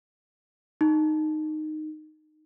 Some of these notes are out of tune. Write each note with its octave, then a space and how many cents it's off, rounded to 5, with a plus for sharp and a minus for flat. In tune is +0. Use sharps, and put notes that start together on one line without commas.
D#4 -10